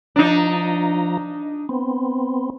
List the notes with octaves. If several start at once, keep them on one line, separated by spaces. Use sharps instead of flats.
F3 D4 D#4 A#5
B3 C4